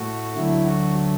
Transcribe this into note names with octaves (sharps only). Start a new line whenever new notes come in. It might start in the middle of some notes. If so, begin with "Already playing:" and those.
Already playing: A2 A3 F#4
D2 D3 F#3 A3 E4
F#4